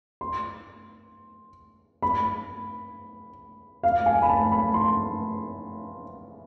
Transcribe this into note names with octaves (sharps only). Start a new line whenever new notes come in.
C6
B5
F5
G#5
B5
A5
B5
C6